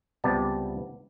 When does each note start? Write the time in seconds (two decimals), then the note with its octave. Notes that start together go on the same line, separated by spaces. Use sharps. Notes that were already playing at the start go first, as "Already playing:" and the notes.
0.24 C#2 C3 G3 B3 D5 A5